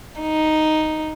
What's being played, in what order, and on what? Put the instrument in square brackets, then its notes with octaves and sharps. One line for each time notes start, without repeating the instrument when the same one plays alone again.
[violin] D#4